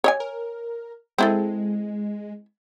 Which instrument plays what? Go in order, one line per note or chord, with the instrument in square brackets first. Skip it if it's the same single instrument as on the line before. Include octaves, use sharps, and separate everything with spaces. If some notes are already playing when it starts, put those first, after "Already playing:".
[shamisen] C#5 D#5 G#5
[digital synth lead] A#4
[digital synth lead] G#3 [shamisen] C4 E4 A4